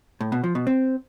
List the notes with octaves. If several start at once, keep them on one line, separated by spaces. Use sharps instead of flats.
A2
B2
F3
B2
C4